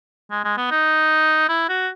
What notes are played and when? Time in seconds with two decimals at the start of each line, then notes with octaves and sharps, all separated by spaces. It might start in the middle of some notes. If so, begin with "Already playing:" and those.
0.31 G#3
0.44 G#3
0.57 B3
0.71 D#4
1.49 E4
1.69 F#4